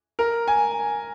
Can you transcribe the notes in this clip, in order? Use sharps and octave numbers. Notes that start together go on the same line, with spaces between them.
A#4
G#5